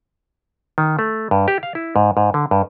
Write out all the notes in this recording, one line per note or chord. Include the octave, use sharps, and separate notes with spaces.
D#3
A3
G2
G4
F5
E4
G#2
G#2
D3
G2